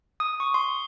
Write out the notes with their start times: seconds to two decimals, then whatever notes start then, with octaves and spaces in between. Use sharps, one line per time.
0.20 D#6
0.40 C#6
0.54 C6